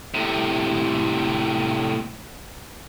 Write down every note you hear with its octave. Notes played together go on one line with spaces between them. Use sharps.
A2 C3